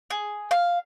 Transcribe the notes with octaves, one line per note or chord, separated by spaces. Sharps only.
G#4
F5